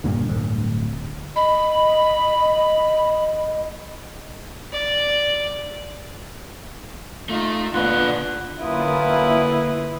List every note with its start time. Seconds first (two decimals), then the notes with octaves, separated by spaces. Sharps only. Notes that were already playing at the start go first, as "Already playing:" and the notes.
0.04 G2 A#2 D3
0.29 D1 G2
1.36 D#5 B5
4.72 D5
7.29 A3 D#4 F4
7.74 A#2 D3 B3 F4 B4 F#5
8.62 F#2 D3 A#3 E4 F4 B4 D#6